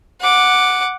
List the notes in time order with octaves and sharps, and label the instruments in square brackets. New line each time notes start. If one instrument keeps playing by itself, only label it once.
[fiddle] F#5 D6